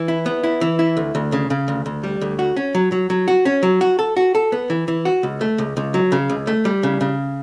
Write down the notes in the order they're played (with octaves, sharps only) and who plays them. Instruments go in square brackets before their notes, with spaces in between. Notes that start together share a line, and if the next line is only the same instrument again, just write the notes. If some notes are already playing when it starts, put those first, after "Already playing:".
Already playing: [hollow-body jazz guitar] E3
E4
B3
E4
E3
E4
D2
D2
C#3
C#3
D2
D2
G3
D2
F#4
C#4
F#3
F#3
F#3
F#4
C#4
F#3
F#4
A4
F#4
A4
B3
E3
E3
F#4
C#2
A3
C#2
C#2
F#3
C#3
C#2
A3
G3
C#3
C#3